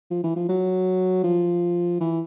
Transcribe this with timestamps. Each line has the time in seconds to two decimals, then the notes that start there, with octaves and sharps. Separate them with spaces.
0.11 F3
0.24 E3
0.36 F3
0.49 F#3
1.24 F3
2.00 E3